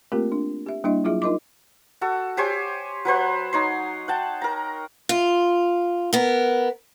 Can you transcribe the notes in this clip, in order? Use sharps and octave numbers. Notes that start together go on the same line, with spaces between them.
A3 A#3 C4 F4 G4 A#4
D4
G4 E5
G3 A#3 D4 E4 D#5 E5
F#3 E4 F4 G#4 E5
D#4 F4 A#4 D#5 C6 D6
F#4 A4
G4 C5 C#5 G#5
F#3 B4 C5 F#5
D#4 C#5 C6
F#5 G5 A5
A#4 A#5
F4
B3 A#4